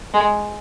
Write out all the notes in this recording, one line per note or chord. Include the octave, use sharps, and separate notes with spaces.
G#3